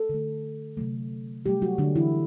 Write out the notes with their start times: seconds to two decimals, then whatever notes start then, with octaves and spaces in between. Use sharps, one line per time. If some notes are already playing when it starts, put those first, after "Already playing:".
Already playing: A4
0.09 D3 A3
0.77 C3 F#3 A3
1.45 C3 F#3 G3 A3 G4
1.62 F#3 F#4
1.78 D3 D4
1.96 E3 E4